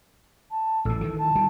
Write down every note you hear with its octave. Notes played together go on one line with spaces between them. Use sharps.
A5
A1 A2 A4
D#3 E3
A5
D#3 G3